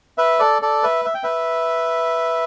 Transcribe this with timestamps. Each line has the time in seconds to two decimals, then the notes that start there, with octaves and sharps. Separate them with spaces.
0.18 B4 E5
0.39 A4 D5
0.62 A4 D5
0.83 B4 E5
1.05 E5
1.15 G5
1.23 B4 E5